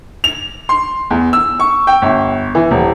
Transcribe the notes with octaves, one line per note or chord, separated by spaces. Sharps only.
F7
C6
E2
E6
C#6
G5
G1
E3
D#1